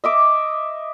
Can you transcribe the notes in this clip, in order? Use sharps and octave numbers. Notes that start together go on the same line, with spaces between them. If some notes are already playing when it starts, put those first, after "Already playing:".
D#5 E5 D6